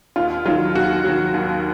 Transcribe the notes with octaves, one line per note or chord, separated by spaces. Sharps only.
D#2 F4
D#3 F#3 F4
D#2 F#4
D#3 F#3
D#2